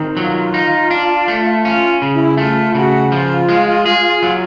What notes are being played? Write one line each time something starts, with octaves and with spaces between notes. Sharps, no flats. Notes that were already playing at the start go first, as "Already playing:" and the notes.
Already playing: D#3 C4
F#3 F4
D#4
D4
A3
C#4 F4
C#3
E4
A3 F4
C#3 F#4
F3 F4
G#3
G#4
F#3